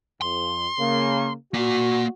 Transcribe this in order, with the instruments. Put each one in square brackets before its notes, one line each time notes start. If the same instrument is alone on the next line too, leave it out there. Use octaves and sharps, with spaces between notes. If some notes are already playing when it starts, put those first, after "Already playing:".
[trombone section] F2 [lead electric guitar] C6
[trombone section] C#3 A#3
[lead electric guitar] A#3 D5 [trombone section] F#4